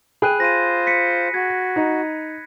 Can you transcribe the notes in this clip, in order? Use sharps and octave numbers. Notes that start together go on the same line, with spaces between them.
G#4 G5 B5 F#6 D#7
F4 C5 A#6 D#7
B6 C#7
F#4 G#6
D#4